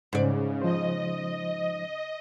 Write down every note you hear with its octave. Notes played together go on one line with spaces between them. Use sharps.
G#2 C#3 D5
F3 C5 D#5